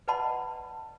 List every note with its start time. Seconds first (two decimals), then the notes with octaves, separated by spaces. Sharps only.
0.08 B4 D5 D#5 F#5 A5 B5